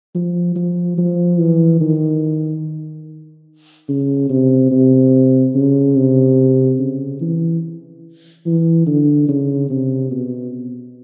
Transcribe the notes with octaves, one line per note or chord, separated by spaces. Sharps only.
F3
F3
F3
E3
D#3
C#3
C3
C3
C#3
C3
C#3
E3
E3
D3
C#3
C3
B2